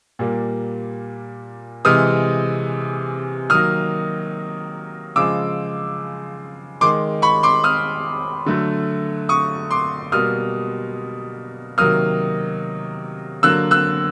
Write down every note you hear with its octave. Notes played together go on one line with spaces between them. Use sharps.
A#2 G3 A#3
C3 E3 G#3 D#6 F6
D#3 F#3 A#3 D#6 F6
C#3 F3 G#3 D6 E6
D#3 G#3 C6 D6
B5 C#6
C6 D6
D#6 F6
D3 F#3 A3
C#6 D#6
C6 D6
B2 G3 A#3 D#6 F6
C3 D#3 F#3 A#3 D#6 F6
D3 F#3 A#3 E6 F#6
E6 F#6